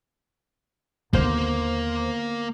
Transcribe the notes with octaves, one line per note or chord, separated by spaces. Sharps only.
D#2 D3 A#3 B3 C5